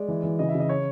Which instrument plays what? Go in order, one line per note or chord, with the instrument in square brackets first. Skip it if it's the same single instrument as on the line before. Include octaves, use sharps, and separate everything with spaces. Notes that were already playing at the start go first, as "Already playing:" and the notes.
Already playing: [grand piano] G#3 D5
E3
E3
C#3 D#5
E5
C#3
D#5
C#5